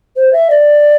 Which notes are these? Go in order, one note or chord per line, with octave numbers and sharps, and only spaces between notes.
C5
E5
D5